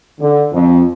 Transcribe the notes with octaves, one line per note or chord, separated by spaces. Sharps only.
D3
F2